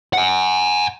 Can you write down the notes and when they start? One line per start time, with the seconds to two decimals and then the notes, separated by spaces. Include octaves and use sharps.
0.13 F#5 G#5